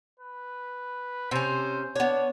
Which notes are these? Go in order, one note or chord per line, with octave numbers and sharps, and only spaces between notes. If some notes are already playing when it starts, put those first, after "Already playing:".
B4
C3 C#4 C5
B3 D4 C#5